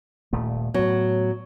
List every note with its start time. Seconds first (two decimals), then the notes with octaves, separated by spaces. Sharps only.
0.33 D#1 A#2 A3
0.74 A2 F#3 B3